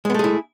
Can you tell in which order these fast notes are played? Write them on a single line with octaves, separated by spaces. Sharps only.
G#3 B3 A3 G#4 E4